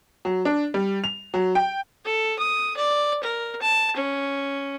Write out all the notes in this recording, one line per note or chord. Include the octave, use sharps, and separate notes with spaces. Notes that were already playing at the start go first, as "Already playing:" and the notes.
F#3
D4
G3
F7
F#3
G5
A4
D#6
D5
A#4
A5
C#4